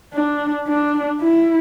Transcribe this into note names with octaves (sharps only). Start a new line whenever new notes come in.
D4
D4
E4